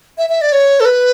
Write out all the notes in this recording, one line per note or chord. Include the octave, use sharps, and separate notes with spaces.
E5
E5
D5
C#5
A4
B4